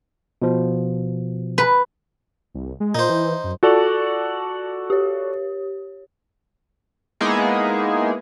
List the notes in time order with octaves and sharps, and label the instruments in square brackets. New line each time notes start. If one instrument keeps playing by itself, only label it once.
[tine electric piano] B2 F3
[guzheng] B4
[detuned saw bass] C2
G#3
[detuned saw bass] A#2 [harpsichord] D#4 C5
[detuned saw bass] E3
F#2
[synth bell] F4 A5 F#7 [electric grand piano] F#4 A4 D5
[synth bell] G4 C#5
[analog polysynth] G#3 A#3 B3 D#4 E4 G#4